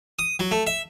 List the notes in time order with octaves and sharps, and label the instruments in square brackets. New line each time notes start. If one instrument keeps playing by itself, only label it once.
[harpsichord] D#6
F#3
A3
E5